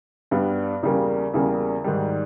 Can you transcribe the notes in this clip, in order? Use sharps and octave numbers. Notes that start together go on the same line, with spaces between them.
G2 G3 B3
E2 C#3 G3 A#3
E2 C#3 G3 A#3
G#2 D#3 G3